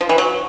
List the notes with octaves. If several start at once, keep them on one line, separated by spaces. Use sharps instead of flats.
F3
E3
F#3